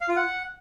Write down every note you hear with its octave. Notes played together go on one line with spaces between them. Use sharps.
F5
F4
F#5